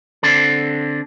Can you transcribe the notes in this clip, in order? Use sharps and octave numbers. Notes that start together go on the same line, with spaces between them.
D3 C4 D4 A4